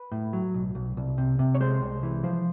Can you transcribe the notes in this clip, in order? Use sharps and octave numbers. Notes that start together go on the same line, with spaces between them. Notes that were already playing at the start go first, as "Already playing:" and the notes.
Already playing: B4
A2
F#3
B1
B1
C2
C3
C3
C#5
G#3 C5
C2
E3
F3 C5